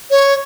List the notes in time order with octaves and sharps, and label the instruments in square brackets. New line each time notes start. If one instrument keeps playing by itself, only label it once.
[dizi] C#5